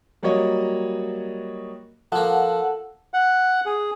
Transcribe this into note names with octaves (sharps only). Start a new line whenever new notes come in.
F#3 G3 A#3 F#4 C#5 D#5
F3 A#3 A4 F#5
F#5
G#4